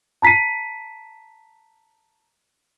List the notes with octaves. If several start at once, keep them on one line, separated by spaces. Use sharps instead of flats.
A5 A#5 B6 C7 D#7